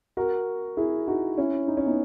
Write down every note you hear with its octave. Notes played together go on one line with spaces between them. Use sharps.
F#4 A#4
E4 G#4
D#4 F#4
C#4 E4
D#4
C#4
B3 D#4